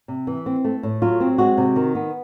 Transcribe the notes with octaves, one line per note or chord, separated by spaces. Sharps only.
C3
E3
C4
A3
A2
F#3 F4
C4
G#3 F#4
C3
D#3
B3